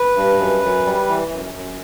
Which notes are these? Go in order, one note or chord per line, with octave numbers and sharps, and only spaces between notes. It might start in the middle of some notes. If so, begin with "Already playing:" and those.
Already playing: B4
G2
F#2
F#2
G3
E3
F#2
F#2